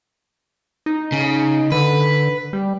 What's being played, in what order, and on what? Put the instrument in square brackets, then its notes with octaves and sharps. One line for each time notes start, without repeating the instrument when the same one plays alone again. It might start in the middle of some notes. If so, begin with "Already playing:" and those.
[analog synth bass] D#4
[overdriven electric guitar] C#3
[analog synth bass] D3 [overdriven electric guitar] B4
[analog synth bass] G3